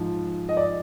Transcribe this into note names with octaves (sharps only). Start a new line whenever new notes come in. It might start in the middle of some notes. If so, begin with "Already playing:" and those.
Already playing: G#2 F3
D#5
D5